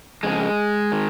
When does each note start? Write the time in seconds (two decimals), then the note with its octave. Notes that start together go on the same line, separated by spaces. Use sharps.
0.23 F2 C#3 G#3
0.92 D#3